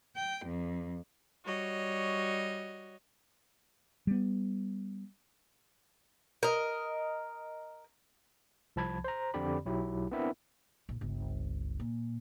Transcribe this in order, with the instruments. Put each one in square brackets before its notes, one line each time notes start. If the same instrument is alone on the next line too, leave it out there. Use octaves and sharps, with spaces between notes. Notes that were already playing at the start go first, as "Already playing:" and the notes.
[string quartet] G5
F2
G3 F#4 C#5 D#5
[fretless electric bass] G3 B3
[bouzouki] A#4 D#5
[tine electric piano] C2 F3 A5 B5 G#6
C5 A#5
F2 D3 C4 G4 D5 B5
B1 F#3 E4 G4
B3 C4 D4 E4 A#4 E5
[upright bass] A#1
G1 C#2
A#2